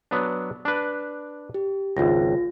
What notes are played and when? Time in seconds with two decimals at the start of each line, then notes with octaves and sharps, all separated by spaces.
0.11 F#3 B3 D4
0.65 D4 B4
1.54 G4
1.97 G#1 C#2 F4 A#6